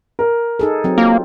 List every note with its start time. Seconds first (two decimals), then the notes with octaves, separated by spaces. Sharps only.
0.19 A#4
0.59 D#4 G#4 A4
0.84 F#3 C4
0.98 A#3 F4